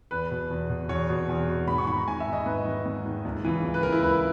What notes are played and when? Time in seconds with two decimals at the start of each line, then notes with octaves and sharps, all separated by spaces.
0.11 E2 B4
0.31 B2
0.51 E2
0.69 B2
0.89 E2 C#5
1.09 B2
1.29 E2
1.48 B2
1.68 G#2 B5
1.78 C#6
1.87 D#3 B5
1.97 A#5
2.08 G#2 G#5
2.20 E5
2.27 D#3
2.33 D#5
2.46 G#2 B4
2.65 D#3
2.86 G#2
3.06 D#3
3.25 C#2
3.45 C#3 E3
3.64 C#2
3.74 B4
3.83 C#3 E3 A#4
3.92 E4
4.02 C#2 B4